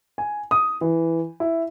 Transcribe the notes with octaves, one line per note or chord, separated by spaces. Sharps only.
G#5
D#6
E3
E4